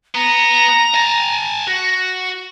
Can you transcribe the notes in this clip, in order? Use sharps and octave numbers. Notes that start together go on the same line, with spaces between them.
B3 A#5
G#5 A5
F#4 A#6